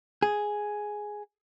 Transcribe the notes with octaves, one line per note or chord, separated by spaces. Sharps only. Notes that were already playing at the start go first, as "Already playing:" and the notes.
G#4